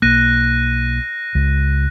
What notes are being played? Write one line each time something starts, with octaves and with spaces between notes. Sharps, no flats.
B1 A#3 F#6 A#6 D#7
C#2